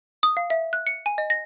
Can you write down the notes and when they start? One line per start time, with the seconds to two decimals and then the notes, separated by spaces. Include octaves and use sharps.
0.23 D#6
0.37 F5
0.50 E5
0.73 F#6
0.87 C#7
1.06 G#5
1.18 D#5
1.30 A#6